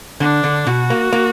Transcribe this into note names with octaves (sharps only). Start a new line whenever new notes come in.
D3 D4
D3
B2 F#4
A#3
A#3